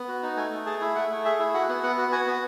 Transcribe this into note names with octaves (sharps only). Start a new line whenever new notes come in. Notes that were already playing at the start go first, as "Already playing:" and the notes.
Already playing: B3
F#4
D#4
A3 G#5
A3
G#4 A5
E4
A3 F#5
A3
G#4 E5
E4
F#4 F#5
B3
B3 F#5
F#4
F#4 G#5
B3